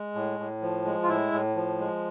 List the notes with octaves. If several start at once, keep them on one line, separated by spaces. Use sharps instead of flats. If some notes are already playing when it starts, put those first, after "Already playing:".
Already playing: G#3
A2
A2
F3
G#3
F4
A2 E4
A2
F3
G#3